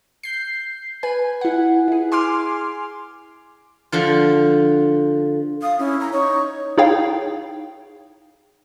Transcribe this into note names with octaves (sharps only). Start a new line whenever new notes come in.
G6 C7
B4 G#5
E4 F#5
E4 G#4
G#5 C6 D6 F6
D3 F3 F4
F5 D#6
C#4 E4
A#5
D#4 C#5
D#4 E4 G#4 C#5 F5 G5